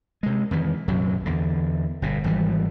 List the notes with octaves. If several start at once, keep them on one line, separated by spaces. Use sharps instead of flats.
C3 G#3
F2 D#3 E3
A#1 F#2 C3 F#3
E2 D3
G1 B2
G#1 E3 F3 G3